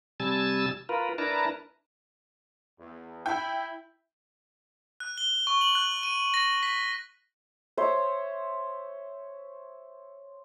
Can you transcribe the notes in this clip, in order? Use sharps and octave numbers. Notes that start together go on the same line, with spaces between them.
C3 G3 G#5 A5 E6 A6
F4 A#4 B4
D4 E4 A#4 B4 A5 A#5
E2
E4 G5
F#6
G7
C#6
F#7
F#6
D#7
A#6
B6
C5 C#5 E5